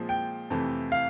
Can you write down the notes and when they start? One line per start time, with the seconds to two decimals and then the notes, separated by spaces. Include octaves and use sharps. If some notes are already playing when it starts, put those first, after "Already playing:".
Already playing: A#2 F3 G#3 C4
0.09 G5
0.50 F2 C3 E3 A3
0.92 F5